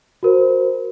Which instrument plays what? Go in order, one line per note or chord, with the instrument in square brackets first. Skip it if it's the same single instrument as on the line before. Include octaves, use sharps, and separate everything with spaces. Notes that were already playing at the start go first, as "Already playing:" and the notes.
[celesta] F#4 A#4 C5